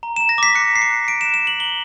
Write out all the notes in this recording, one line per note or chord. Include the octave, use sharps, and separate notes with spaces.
A#5
A#5 E7
A#6
D6 B6
F#6 C#7
A#5 C7
C#7
F#6
A#5 D7
E7
F#6
E7
F#6 F#7
A#5 G7